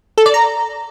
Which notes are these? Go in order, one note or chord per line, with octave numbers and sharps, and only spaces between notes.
A4
D5
A#5